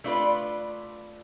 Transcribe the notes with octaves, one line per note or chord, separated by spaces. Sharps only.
A3 D4 F4 B4 D5